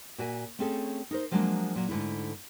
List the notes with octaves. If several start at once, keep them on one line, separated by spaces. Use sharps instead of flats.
A#2 F#4 E5 G#5
A3 C4 C#4 G#4 A4
D#4 A#4 C5
F3 F#3 G#3 A#3 D4
A#2 F#3
G#2 D3 A3 E4